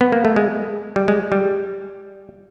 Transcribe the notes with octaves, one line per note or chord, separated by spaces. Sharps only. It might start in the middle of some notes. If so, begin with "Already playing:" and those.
B3
A#3
A3
G#3
G3
G#3
G3